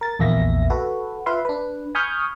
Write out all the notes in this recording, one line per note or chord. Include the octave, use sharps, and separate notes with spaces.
A#4 A6
A#1 E2 A#3 E5 A#6
F#4 A4 B4
F4 B4 E5 F5 C6
D4 B4
G#5 B5 C#6 D#6 F6 G6